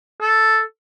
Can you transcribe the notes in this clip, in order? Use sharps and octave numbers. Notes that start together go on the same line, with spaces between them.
A4